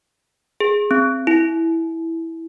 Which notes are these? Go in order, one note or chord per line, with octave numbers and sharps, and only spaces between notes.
G#4
C4
E4